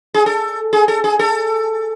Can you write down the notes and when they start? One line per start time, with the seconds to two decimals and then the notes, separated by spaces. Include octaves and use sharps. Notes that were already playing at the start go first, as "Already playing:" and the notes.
0.14 G#4
0.26 A4
0.73 G#4
0.88 A4
1.04 G#4
1.19 A4